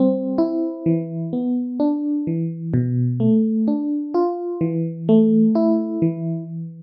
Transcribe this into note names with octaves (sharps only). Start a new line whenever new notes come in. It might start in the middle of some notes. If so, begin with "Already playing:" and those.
Already playing: G3 C4
E4
E3
B3
D4
E3
B2
A3
D4
F4
E3
A3
E4
E3